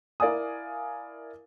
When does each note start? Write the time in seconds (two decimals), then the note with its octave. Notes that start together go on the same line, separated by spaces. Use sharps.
0.20 E4 A#4 D5 F5 G#5 D#6